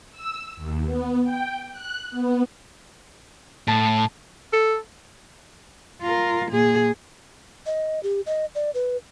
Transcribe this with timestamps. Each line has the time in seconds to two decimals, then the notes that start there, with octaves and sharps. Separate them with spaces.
0.12 E6
0.56 D#2
0.85 B3
1.23 G5
1.71 F#6
2.10 B3
3.68 A2 A5
4.53 A4
6.02 F4 A#4
6.51 A#2 G#4
7.66 D#5
8.03 G4
8.26 D#5
8.55 D5
8.74 B4